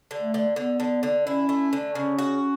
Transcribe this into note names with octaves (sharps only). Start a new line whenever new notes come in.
D3
A3
D3
D3 B3
D3
D3
C#4 E4
A3
D3
C#3 C#4
F#4